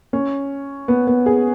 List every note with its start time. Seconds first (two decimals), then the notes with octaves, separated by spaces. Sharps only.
0.13 C#4
0.88 B3
1.07 B3
1.26 G#4